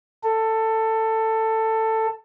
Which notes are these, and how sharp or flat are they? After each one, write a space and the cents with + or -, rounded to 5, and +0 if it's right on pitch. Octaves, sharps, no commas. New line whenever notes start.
A4 +15